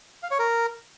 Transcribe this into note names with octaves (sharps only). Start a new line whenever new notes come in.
F5
C#5
A#4